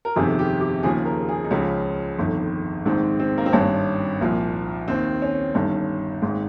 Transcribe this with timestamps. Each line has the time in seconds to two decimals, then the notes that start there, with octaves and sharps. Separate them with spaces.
0.05 A#4
0.16 G1 F2 C3 D#3 G#4
0.39 G4
0.61 G4
0.83 D#2 C#3 F3 G#4
1.05 A#4
1.29 G#4
1.44 D#4
1.51 C#2 C#3 F3 C#4
2.18 G1 F2 D#3
2.86 A#1 G#2 D#3 C4
3.20 C4
3.38 A#3
3.46 C4
3.53 G#1 G2 D#3 C#4
4.21 C2 A#2 F3
4.88 D#2 D#3 C4
5.22 C#4
5.55 G1 G2 D#3 C#4
6.22 G#1 G#2 D#3